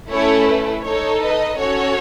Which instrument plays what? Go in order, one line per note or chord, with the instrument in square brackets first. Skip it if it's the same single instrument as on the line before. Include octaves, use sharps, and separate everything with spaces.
[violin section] A3 C#4 E4 A4 C#5
B4
D#4 A4 C#5
B4 D#5
C#4 F#4 A4 C#5